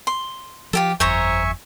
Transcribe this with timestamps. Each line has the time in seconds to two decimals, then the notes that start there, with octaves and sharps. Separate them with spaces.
0.07 C6
0.73 F3 F4 G4 A4
1.00 G1 F2 C5 C#5 E5 G#5 A#5 C#6